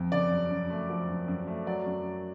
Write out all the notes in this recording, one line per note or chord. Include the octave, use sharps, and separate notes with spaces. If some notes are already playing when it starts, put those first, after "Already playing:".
Already playing: F2
C#3 D5
F#2
F#2
A3
F3
F#2
F#2
A3
F#3 D5
F#2
F#2